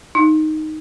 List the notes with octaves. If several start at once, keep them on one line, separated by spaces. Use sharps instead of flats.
D#4